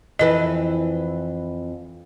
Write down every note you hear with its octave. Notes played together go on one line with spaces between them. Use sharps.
F2 E3 B4 D#5